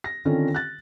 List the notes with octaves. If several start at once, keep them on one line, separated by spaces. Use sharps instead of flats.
A#6
D3 D#3 C4 C#4 F4 A4
F#6 A6